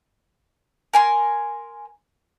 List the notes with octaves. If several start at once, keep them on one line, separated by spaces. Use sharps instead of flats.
A#4 G#5 C6